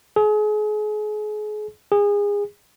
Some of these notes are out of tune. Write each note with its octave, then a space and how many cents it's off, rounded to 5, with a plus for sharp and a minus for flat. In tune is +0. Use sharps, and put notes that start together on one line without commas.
G#4 +35
G#4 -25